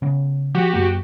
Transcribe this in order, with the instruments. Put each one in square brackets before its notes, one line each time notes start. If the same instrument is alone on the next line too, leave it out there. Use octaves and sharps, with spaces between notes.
[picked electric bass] C#3 B3 C#4
[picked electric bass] F3 [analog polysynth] F#4 G4
[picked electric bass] F#2 F#3 A#3